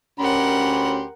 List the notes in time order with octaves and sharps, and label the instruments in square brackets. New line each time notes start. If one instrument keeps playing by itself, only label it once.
[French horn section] D2 C#4 [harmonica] G4 B5 C6 [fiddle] A#4 F#5